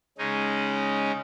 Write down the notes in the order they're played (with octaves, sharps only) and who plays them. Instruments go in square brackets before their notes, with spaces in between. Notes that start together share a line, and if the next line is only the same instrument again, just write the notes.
[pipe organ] C#3 G#3 C#4 D#4